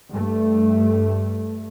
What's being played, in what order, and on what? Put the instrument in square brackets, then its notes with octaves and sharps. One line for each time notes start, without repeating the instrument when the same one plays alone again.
[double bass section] G2 A3